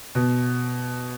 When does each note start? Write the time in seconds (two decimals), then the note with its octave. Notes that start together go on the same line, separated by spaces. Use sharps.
0.15 B2